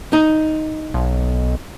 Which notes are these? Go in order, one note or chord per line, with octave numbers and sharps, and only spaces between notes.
D#4
B1